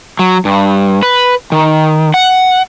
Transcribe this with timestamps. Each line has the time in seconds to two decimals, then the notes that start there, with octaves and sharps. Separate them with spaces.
0.19 F#3
0.45 G2
1.03 B4
1.52 D#3
2.14 F#5